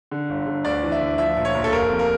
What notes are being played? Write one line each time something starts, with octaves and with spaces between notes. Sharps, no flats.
D3
G1
D3
D2 D5
E3
E5
D2
F3 E5
A#2
C#5
A#1
A4
F1 A#4
F2
A#4